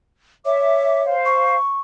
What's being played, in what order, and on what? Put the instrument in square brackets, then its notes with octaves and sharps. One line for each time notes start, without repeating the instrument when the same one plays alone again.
[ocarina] C#5 [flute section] E5 D6
[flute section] C5 F5
[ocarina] C#6